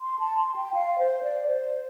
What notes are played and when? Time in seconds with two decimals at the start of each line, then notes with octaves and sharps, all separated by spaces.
0.01 C6
0.19 A5
0.37 C6
0.56 G5
0.74 F5
0.99 C5
1.23 D5
1.47 C5